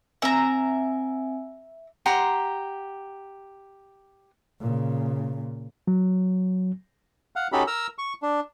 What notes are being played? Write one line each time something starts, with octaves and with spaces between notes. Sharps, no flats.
C4 E5 G#5 A#5
G4 F#5 A#5 C6
A#2 C#3
F#3
F5 F#5
C#4 D#4 F#4 G4 A4 B5
A#4 A#5 E6
C#6
D4